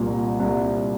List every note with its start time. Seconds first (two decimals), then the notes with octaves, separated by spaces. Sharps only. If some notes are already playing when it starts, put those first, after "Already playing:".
Already playing: C2 A#2
0.39 C2